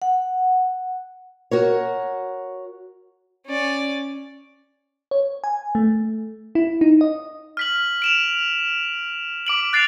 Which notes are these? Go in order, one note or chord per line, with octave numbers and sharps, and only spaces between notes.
F#5
F#4 A#4 C#5
C#4 D5
C#5
G#5
A3
E4
D#4
D#5
F6 B6 F#7
D7 E7 F7
D6 D7 F#7
F#6 A6 C7 D7 F7